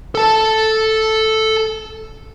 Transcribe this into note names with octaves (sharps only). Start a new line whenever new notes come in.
A4 A5